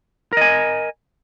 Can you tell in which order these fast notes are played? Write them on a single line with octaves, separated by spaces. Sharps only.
A#4 D#5 G#5